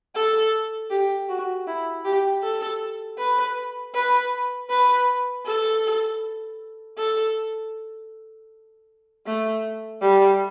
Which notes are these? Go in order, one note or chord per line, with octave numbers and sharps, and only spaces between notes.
A4
G4
F#4
E4
G4
A4
B4
B4
B4
A4
A4
A3
G3